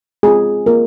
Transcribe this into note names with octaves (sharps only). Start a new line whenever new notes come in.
G#3 C4 F4 G#4
A#3 F4 A#4